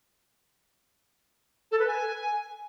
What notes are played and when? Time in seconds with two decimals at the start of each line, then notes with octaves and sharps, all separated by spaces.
1.71 A4
1.79 B4
1.87 G#5